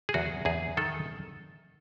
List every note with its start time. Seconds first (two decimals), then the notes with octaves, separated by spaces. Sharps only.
0.09 G#4
0.14 E2 F#4
0.45 E2 G#4
0.77 D#3 A4